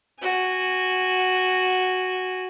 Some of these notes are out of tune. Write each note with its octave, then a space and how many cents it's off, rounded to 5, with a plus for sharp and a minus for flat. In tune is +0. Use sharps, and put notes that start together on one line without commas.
F#4 +0 G#5 -20